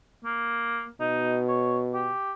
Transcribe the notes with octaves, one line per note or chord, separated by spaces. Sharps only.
A#3
B2 D#4
C#5
G4